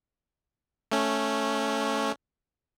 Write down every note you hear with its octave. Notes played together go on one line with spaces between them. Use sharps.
A3 C#4